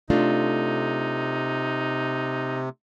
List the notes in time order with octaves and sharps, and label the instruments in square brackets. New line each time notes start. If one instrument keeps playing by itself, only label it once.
[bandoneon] C3 [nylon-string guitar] A3 D4 F4 [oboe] D#4